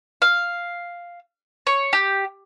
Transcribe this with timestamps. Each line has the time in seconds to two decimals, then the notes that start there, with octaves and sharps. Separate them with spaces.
0.22 F5
1.67 C#5
1.93 G4